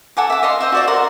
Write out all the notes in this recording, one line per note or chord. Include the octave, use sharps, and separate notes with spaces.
A4 F#5 G#5 D6
E5 D6
D#5 F5 C6
C5 D#5 E5
F#4 D5 E5
A#4 C5 F#5 C6